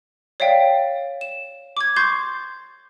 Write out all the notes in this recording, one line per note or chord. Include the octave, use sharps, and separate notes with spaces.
C#5 D5 E5 F5 G5
E7
D6 G#6
C6 C#6 G6 A6 C7